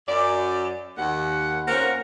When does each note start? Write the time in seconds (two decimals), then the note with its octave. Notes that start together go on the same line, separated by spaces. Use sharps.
0.08 F#2 D5
0.98 D#2 F#5
1.68 F2 A#3 C#4 A#4 C5 F#5